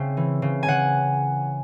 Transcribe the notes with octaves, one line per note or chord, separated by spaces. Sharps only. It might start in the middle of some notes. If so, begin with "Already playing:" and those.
Already playing: C#3 C4 E5
E3
C#3
G#5
C#3 F#5